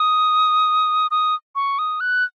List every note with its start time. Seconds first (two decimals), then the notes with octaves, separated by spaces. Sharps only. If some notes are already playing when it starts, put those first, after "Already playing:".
Already playing: D#6
1.11 D#6
1.55 C#6
1.79 D#6
2.00 F#6